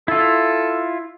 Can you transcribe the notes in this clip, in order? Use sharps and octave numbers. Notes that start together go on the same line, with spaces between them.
E4 F4 A4